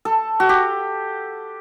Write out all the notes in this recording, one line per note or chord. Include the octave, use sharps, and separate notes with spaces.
A4
F#4
G4